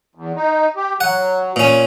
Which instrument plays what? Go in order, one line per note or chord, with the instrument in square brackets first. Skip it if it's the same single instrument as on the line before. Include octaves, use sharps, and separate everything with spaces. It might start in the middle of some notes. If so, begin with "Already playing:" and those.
[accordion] E2
D#4
G4
[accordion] F#3 [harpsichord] F#5
[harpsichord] A#2 C#4